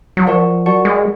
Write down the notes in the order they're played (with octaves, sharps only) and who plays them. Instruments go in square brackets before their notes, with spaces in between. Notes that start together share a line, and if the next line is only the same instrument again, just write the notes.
[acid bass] F#3
[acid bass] F3 [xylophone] A#4 D5 F#5 A5 C#6
[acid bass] F#3 [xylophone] A#4 D5 F#5 A5 C#6
[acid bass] G#3